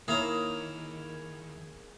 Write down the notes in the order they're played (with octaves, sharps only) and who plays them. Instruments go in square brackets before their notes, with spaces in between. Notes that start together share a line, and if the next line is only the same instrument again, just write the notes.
[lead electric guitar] D#3 [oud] A#3 C#5 [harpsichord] E4 F5 A#5 [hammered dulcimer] G#4